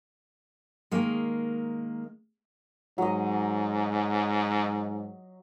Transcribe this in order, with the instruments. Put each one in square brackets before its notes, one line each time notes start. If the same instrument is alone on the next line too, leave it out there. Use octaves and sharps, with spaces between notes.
[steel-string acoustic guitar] D#3 G#3 A#3
[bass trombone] G#2 [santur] F#3 D#5